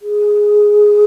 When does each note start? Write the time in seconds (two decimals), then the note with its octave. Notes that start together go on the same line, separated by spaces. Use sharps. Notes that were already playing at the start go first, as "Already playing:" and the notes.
0.02 G#4